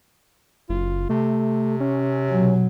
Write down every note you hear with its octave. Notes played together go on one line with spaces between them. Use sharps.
F#1 F4
C3 A3
C#4
B2 F#3